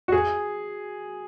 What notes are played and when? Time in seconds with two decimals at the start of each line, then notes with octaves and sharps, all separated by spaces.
0.08 F#4
0.12 G#4